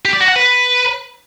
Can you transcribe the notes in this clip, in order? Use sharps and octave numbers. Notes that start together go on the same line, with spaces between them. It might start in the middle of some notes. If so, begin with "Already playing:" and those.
G4
D5
F#4
F#5
B4